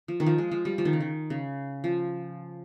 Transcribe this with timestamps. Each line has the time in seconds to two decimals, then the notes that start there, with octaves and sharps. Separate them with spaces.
0.08 F3
0.20 D#3
0.26 F3
0.38 G#3
0.51 F3
0.65 G3
0.78 F3
0.85 D#3
0.93 C#3
1.01 D#3
1.30 C#3
1.84 F3